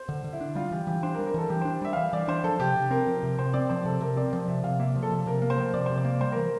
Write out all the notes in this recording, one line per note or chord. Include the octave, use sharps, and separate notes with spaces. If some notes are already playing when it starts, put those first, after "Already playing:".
Already playing: C5
D3
D3
E4
D4
G3 F4
E3 G4
E3 G4
D4 C5
A#4
G3
A#4
E3 A4
E3 G4
D4 C5
G3 E5
F5
E3 E5
E3 D5
D4 C5
F3 A4
C3 G4
C3
C4 A#4
F3
C3
C3 C5
C4 D5
F3 C5
C3 A4
C3 A#4
C4 D5
F3 D5
C3 E5
C3 F5
A#3 E5
F3
A4
C3
C3 A#4
A#3
C5
F3
C3 D5
C3 C5
D5
A#3
G3 C5
E3 A#4